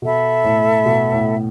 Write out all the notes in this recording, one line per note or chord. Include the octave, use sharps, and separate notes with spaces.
B2 A4 E5 B5
A2
B2
A2